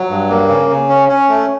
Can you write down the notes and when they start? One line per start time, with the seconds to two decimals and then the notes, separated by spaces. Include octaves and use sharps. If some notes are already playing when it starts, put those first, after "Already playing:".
Already playing: F#3
0.09 G2
0.29 A#3
0.48 C#3
0.69 C#3
0.89 C#4
1.08 C#4
1.29 A3